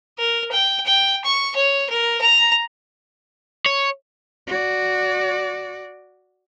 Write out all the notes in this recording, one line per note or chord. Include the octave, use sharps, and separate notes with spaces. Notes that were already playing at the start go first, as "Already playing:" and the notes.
A#4
G5
G5
C#6
C#5
A#4
A#5
C#5
F#4 D5